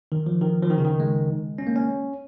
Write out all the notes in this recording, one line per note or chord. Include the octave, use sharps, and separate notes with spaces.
D#3
F3
D#3
F3
D#3
C#3
D#3
G#3
C#4
A#3
C#4